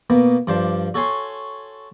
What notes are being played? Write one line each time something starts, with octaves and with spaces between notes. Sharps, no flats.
B2 A#3 B3
G2 F3 C5 D5 A5
F#4 A4 C#5 G#5 C6